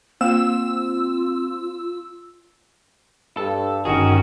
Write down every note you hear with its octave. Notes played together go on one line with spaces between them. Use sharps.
A#3 C4 F4 E6
G2 A4
G1 D#3 C#4 F#4 G#4